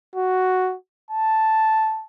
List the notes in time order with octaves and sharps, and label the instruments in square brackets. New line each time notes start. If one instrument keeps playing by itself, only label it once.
[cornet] F#4
A5